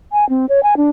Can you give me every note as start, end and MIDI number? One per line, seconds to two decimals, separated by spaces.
0.12 0.28 80
0.29 0.46 60
0.49 0.60 73
0.63 0.75 80
0.77 0.90 62